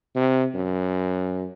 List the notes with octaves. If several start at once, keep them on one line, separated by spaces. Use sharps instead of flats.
C3
F#2